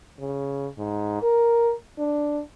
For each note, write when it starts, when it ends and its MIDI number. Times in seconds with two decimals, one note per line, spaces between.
0.20 0.67 49
0.78 1.20 44
1.22 1.73 70
1.98 2.41 62